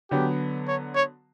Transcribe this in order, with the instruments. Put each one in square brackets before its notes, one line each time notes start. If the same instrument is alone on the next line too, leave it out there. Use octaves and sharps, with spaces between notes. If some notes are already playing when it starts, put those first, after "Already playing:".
[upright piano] D3 F#3 B3 [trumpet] G4
[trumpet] C#5
C#5